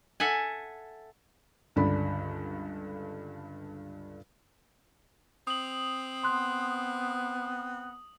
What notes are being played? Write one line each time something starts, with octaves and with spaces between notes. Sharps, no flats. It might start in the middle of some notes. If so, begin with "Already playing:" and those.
A4 E5 F#5 G#5
C#2 G2 D3 D4 B5
C4 D#6 F#7
B3 C6 F#6